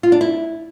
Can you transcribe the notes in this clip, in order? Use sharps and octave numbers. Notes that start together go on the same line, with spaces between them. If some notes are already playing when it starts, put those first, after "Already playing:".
F4
D4
E4